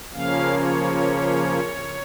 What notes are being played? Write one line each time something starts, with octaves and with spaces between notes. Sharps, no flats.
C#3 F3 A#3 C#4 F5
C#5